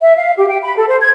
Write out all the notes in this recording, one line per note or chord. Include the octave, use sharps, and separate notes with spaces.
E5
F5
G4
G5
B5
A4
C5
G#6